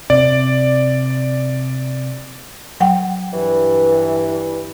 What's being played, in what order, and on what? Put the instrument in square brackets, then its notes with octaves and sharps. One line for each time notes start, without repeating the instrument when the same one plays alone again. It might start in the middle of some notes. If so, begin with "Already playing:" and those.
[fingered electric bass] C3 [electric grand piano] D5
[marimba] F#3 F#5 G5
[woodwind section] G2 E3